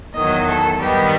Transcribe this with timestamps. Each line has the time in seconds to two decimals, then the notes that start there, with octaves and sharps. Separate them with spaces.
0.13 E2 D#3 F#3 D#5
0.46 A4
0.78 G2 D#3 G3 B3 G4